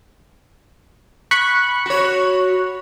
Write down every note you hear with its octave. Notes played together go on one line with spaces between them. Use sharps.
B5 C#6 F#6
F#4 C#5